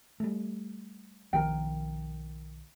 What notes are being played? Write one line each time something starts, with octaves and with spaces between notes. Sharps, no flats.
G3 A3
B1 D#3 F3 A#4 G5